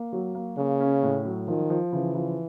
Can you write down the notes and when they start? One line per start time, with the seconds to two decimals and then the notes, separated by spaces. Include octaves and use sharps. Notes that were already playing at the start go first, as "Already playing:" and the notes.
Already playing: A#3
0.13 F#3
0.35 A#3
0.58 C#3 A#3
0.80 C#4
1.03 A2
1.25 F#3
1.48 D#3 F3
1.70 F3
1.92 C#3 E3
2.15 F3